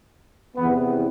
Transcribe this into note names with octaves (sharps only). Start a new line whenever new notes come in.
E2 C3 E3 B3